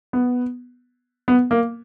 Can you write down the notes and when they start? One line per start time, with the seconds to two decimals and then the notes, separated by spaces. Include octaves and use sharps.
0.13 B3
1.28 B3
1.51 A#3